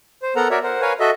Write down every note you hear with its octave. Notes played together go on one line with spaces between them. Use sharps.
C5
B3 A4 A#4 F#5 A#5
F#4 A#4 C#5 D5 E5
A#4 C5 F#5
A#4 B4 C#5 F5 G#5
F#4 A4 D#5 E5